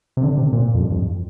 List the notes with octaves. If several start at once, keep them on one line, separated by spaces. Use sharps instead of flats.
C3
D3
C3
A#2
F2
G2
F2